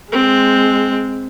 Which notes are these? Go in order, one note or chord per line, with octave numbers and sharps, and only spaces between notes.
G#3 C4